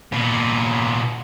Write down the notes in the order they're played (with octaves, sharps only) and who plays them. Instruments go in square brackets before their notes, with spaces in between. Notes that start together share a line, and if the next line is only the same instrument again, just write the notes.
[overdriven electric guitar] A#2 B3